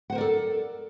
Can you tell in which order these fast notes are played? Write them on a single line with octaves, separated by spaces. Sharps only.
F#5 C5 A#4 D5 A4